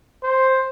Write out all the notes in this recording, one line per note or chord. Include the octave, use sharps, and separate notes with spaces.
C5